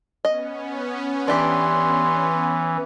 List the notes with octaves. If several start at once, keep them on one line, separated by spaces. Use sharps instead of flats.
B3 C#4 D#5
E3 D4 G4 C6